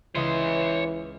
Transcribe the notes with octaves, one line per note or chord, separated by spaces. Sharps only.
C#2 E3 C#5 E5 C6 D#6